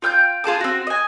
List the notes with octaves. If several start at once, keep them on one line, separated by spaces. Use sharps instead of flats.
F4 G5 F6 G6
F4 G#4 A5 D6
C4 F#4
D#5 G#5